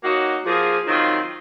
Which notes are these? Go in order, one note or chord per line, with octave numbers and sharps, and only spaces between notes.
F#3 A#3 D#4 F#4
F3 A#3 F4 G#4
D#3 F#3 C4 F4